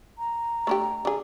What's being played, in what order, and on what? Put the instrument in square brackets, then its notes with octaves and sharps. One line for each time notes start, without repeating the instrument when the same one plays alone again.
[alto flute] A#5
[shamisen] A3 D4 G4
D3 G#4